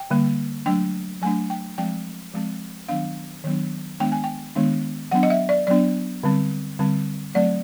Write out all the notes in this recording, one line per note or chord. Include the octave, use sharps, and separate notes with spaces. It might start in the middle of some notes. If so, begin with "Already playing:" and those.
Already playing: G5
D3 G3 A#3
F#3 A3 D4 G5
F#3 A3 D4 G#5
G5
F3 G#3 C4 G5
F3 G#3 C4
D#3 F#3 B3 D4 F5
D#3 F#3 B3 D4
D#3 G#3 B3 D4 G5
G#5
G5
D#3 G#3 B3 D4
F#3 B3 D4 F#5
D#5
E5
D5
F#3 B3 D4 D5
D3 G3 C4
D3 G3 C4
F#3 A3 C4 D5